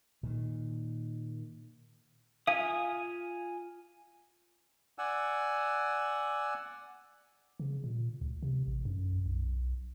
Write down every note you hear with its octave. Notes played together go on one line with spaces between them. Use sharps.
A#2 D#3
F4 F5 G#5 D#6
D5 F#5 G#5 E6
C#3
A#2
C#2
C3
A1
F#2
B1